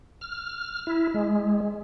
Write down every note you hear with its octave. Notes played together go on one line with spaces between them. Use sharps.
F6
E4
G#3